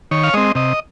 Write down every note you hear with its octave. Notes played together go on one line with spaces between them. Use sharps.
D#3 C#5
F5
G#3 C4 D#5
C3 D#5